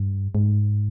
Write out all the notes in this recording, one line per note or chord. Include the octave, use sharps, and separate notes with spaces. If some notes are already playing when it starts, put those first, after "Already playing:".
Already playing: G2
G#2